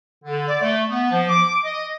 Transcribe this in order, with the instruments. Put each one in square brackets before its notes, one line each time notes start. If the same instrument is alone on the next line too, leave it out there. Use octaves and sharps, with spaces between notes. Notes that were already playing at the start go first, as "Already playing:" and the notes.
[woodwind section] D3
D5
A3
B3
F3
D6
D#5